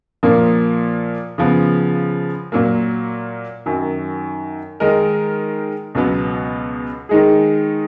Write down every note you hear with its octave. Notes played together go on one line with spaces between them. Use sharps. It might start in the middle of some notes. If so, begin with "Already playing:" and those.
A#2 F3 A#3
C#3 F3 B3
A#2 F#3 A#3
F#2 D#3 F#3
D#3 G#3 D#4 A#4 D#5
C#2 B2 F#3 B3
D#3 G#3 D#4 G#4